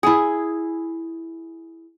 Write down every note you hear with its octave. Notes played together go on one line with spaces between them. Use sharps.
E4 G#4